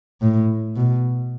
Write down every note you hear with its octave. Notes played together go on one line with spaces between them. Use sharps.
A2
B2